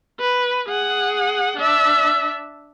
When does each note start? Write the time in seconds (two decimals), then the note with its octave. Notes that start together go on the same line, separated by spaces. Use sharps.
0.20 B4
0.69 G#4 F#5
1.58 D4 E5